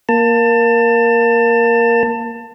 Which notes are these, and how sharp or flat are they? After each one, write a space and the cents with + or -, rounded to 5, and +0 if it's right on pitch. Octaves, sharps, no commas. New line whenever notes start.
A#3 +5 A5 +25